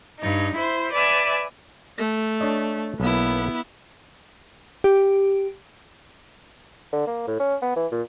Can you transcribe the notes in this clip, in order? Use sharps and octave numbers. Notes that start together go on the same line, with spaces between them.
G2 D#4
E4 C5
B4 D5 E5 G#5
A3
D4 C#5 D#5
B1 A#3 B3 E4
G4
D3
A#3
A2
C#4
B3
E3
A#2